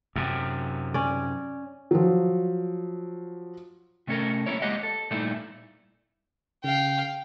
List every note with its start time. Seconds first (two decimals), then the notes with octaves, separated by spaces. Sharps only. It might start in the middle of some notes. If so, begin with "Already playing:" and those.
0.16 F#2 C3
0.94 C#4 D5
1.91 F3 F#3
4.07 C3 A3 C#4 A4 A#4
4.46 G3 G#3 A#3 C#4 E4 C#5
4.62 G#3 A#3 G4 D#5 F#5
4.83 A4
5.11 A#2 G3 A3 A#3 D#4 E4
6.64 C#3 F5 G5